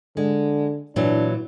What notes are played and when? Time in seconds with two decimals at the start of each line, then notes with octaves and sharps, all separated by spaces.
0.17 D3 G#3
0.96 A#2 E3 F#3 D4